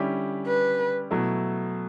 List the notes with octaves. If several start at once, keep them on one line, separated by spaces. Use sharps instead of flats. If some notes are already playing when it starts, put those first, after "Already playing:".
Already playing: D3 G3 C#4 E4 G4
B4
B2 F#3 A3 E4